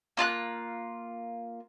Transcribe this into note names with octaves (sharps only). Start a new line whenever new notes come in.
A#3 F4 A5 F#6